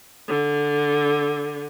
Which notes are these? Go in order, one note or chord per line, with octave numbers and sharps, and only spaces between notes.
D3